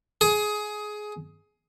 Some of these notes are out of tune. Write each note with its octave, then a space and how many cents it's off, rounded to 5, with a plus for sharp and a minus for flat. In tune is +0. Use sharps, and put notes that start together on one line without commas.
G#4 +15